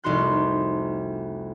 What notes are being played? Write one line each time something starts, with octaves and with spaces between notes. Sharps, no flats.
F1 C2 D#4 F#4 C6 F#6